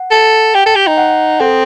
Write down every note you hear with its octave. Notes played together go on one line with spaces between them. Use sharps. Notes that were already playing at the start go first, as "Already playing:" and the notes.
Already playing: F#5
A4
G4 G5
A4
G4
D#4
F#5
C4 A4